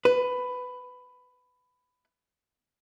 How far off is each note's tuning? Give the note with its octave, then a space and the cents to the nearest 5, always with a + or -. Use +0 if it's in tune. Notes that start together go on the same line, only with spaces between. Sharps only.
B4 +15